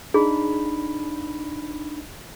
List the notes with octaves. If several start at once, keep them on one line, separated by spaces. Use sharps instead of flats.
D4 D#4 G#4 B5